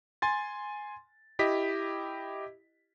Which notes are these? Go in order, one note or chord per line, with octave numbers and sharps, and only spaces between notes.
G#5 C6 A6
E4 G4 D#5 B6